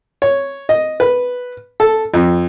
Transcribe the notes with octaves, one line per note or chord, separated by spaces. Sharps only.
C#5
D#5
B4
A4
F2